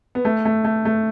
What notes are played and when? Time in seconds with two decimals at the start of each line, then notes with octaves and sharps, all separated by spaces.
0.15 B3
0.25 A3
0.45 A3
0.65 A3
0.85 A3